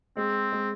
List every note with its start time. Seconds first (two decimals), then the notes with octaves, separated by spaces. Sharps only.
0.17 G#3 C4
0.52 G#3